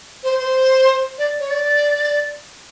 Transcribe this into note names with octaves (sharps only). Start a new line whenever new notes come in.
C5
C5
D5
C#5
D5